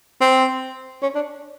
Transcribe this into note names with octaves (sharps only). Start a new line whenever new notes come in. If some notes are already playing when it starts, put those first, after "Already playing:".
C4
C#4
D4